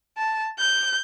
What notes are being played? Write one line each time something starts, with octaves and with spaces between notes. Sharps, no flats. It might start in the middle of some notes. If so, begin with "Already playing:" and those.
A5
G6